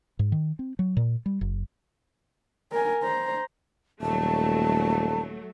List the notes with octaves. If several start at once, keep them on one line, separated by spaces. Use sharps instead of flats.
G#2
D#3
C4
F#3
A#2
G3
F#1
A#4 G#5
C5 A#5
D#1 F#3 A3 A5